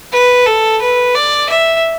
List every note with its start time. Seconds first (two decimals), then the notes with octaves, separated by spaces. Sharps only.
0.12 B4
0.46 A4
0.81 B4
1.15 D5
1.49 E5